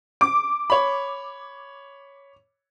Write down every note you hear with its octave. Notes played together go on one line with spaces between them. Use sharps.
D6
C#5 B5